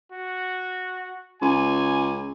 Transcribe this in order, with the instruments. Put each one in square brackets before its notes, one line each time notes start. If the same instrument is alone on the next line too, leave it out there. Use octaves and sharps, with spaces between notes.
[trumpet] F#4
[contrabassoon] C#2 [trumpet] G#5